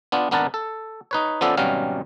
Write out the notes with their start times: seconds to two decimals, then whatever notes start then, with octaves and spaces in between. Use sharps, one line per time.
0.12 B3 D4 F4
0.31 G#1 B3 D4 A#4 B4 A5
0.54 A4
1.11 D#4 B4 C#5
1.41 F3 B3 C#4 A4 D5 E5
1.57 G#1 B2 F#3 G3 C#4 F5